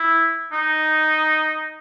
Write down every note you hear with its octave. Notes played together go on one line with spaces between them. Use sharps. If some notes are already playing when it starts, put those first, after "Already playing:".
Already playing: E4
D#4